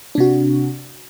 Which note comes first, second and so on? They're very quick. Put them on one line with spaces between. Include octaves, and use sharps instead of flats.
D4 C3 F#4